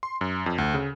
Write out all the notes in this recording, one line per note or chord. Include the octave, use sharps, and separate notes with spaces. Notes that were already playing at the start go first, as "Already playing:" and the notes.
C6
F#2
F2
D2
C#3